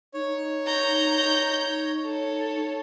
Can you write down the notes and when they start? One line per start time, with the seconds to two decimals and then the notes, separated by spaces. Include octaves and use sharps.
0.14 D#4 C#5
0.67 A#5 G6
2.05 A4 C#5